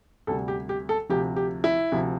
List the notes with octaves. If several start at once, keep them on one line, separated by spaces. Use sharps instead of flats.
D2 C3 G3 A4
G4
G4
A4
D2 C3 F3 G4
G4
E4
D2 C3 F3